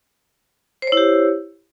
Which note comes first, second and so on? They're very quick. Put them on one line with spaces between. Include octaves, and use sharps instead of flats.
C5 C#5 E4 G4